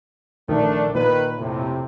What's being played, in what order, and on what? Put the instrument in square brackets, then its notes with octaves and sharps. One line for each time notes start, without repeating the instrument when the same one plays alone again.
[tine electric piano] A#1 D#3 [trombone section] A3 D4
[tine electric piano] A#2 [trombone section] D#3 B4
[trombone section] F2 A2 C3